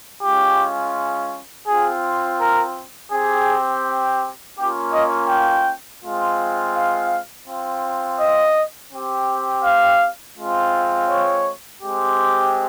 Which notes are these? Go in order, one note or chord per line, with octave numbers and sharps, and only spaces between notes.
G#3 C#4 F4 G4
C4 F4 G#4
A#4
C4 G4 G#4
A#3 C#4 F4 G4
D#5
G5
G#3 C4 F4
F5
C4 F4
D#5
C4 G4
F5
G#3 C4 F4
C#5
G#3 C4 G4